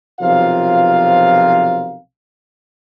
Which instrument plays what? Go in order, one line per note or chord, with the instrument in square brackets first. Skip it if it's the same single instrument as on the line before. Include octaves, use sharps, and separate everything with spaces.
[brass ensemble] B1 C3 F3 F4 A#4 F5